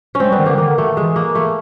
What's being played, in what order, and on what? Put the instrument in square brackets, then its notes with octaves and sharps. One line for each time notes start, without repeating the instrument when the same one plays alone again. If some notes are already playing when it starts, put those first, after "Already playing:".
[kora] C#4
[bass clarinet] G#3 [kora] C4
[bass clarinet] G3
[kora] B3
[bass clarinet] D#3
[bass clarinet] D3 [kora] A#3
[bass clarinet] D#3 [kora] A#3
[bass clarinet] D3
D#3
[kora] A3
[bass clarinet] E3 [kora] G#3
[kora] A#3
A3